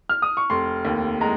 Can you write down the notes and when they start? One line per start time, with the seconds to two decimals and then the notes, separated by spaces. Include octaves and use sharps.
0.09 F6
0.22 D#6
0.37 C#6
0.50 F1 C6
0.85 D#2
1.21 G#3 A#5